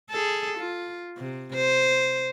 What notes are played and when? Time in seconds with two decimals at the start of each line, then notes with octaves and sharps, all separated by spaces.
0.11 G#4 A4
0.58 F4
1.17 C3
1.54 C5